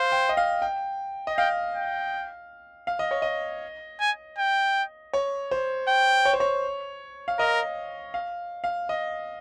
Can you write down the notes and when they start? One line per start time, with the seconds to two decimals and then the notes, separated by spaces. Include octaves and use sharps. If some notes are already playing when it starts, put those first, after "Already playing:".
Already playing: C5 F5
0.12 G5
0.29 D#5
0.37 F5
0.62 G5
1.27 D#5
1.37 F5 G5
1.75 G5
2.87 F5
2.99 D#5
3.11 C#5
3.22 D#5
4.00 G#5
4.38 G5
5.13 C#5
5.51 C5
5.88 G5
6.25 C#5
6.34 C5
6.40 C#5
7.28 F5
7.38 A#4 D#5
8.14 F5
8.64 F5
8.89 D#5